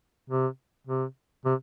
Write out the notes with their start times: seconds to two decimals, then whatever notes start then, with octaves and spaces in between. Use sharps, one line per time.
0.30 C3
0.87 C3
1.45 C3